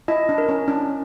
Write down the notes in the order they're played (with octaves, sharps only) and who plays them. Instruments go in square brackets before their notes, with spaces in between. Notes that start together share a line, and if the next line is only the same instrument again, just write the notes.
[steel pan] E4 [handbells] D#5
[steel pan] D4
[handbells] A#4
[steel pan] C#4
[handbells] C#4 [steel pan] D4